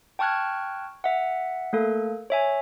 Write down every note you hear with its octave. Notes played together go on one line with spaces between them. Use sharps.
G5 A5 C#6 F6 F#6 G#6
E5 F#5
A3 A#3 A4
C#5 E5 G#5